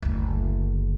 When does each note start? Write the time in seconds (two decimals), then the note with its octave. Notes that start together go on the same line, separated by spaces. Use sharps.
0.02 F#1 D2